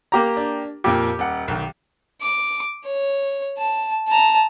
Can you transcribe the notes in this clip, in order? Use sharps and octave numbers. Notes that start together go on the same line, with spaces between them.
A#3 G4 A#5
D4
F2 A#2 A#3 G4
D#1 F#5
B1 D#3
D6
C#5
A5
A5 A#5